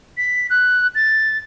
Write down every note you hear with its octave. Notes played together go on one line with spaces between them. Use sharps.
B6
F#6
A6